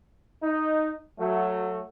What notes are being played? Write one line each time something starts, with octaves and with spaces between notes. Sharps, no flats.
D#4
F#3 A3